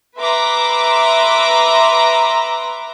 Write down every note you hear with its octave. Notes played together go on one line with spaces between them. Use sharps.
B4 E5 A#5 C6 D6